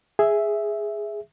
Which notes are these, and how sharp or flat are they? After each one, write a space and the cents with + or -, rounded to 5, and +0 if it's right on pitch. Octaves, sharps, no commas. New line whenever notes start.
G#4 +0 E5 +0